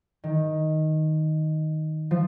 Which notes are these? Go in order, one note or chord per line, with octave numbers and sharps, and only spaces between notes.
D#3
F3